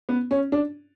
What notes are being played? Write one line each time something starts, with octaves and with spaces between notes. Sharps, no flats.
B3
C#4
D4